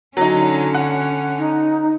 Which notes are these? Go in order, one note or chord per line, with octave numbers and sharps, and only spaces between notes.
D3 F#3 C#4 D#4
F#5
D#4